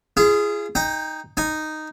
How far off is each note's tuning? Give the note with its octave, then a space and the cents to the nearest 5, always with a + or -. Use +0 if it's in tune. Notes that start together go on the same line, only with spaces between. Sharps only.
F4 -40 G#4 +0
D#4 +0 G5 +25
D#4 -5 G#5 -10